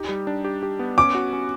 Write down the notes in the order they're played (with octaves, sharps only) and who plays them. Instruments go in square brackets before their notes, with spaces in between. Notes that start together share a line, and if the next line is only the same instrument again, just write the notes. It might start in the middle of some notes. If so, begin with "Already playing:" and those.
Already playing: [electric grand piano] D#4 G4
G3
D4
G4
G4
B3
[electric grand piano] C#4 [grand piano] D6
[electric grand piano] F#4
C#4